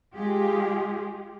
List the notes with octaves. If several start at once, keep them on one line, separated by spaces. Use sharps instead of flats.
G#3 F4 G4 G#4